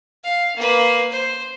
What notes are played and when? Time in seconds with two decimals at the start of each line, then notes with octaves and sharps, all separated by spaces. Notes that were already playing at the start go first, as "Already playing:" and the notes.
0.24 F5
0.56 A#3 B4
1.11 C5